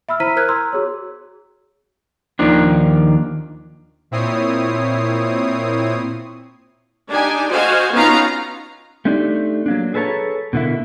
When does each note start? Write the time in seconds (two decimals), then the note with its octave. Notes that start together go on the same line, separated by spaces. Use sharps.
0.09 E5 B5 E6 F6
0.20 E4 C5 A#5 B6 D#7
0.36 A#4 C5 F6 F#6 G#6
0.49 A#5 C6 E6
0.73 F#4 G#4 C#5
2.39 D#2 D#3 F3 D4
4.11 A#2 C4 E4 C#5 D#6 C7
7.10 D4 D#4 G4 G#5
7.49 F#4 C5 D#5 F5 G#5
7.93 B3 C#4 D#4 F4 F5 A#5
9.05 A3 C4 D4 D#4 G4 D5
9.66 F#3 A#3 D4
9.94 G#4 A4 B4 C#5 A5 A#5
10.53 B2 D3 A#3 E4